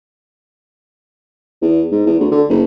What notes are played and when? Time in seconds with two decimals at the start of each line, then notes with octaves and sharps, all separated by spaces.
1.62 E2
1.92 G#2
2.06 E2
2.20 D2
2.31 D3
2.49 F#1